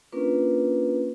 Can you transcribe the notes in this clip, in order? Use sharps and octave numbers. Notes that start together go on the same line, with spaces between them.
A#3 C#4 D4 F4 A#4 B4